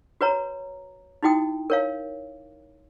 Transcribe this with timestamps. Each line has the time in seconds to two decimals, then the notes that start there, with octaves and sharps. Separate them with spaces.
0.21 F#4 B4 C#5 A#5
1.23 D#4 E4 F#4 G5 D#6
1.70 A#4 C#5 F5